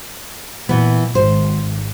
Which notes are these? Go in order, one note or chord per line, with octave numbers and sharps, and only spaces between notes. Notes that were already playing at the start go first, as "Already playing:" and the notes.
A#2 E3 B3
G#1 C5